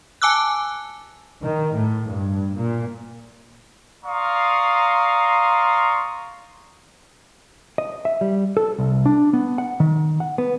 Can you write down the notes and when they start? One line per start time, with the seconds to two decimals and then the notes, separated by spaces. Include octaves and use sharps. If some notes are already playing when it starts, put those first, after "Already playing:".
0.22 G#5 A5 D6 E6 F#6
1.40 D#3
1.73 A2
2.07 G2
2.53 A#2
4.05 D5 F5 A#5 C6 C#6 D#6
7.78 D#5
8.05 E5
8.21 G3
8.57 A4
8.79 C2
9.06 D4
9.33 B3
9.58 F#5
9.80 D#3
10.20 F#5
10.38 B3